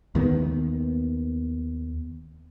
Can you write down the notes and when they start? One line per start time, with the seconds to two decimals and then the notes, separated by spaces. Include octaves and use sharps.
0.15 D#2 D#3 E3 B3